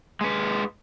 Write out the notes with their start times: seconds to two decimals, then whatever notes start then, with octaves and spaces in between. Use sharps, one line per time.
0.21 G#3 B4